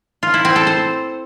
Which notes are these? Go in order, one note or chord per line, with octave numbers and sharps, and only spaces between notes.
F4
E4
C4
A4
C5